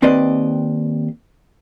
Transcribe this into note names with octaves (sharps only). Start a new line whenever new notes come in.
D#2 C4 B4 D5 D#5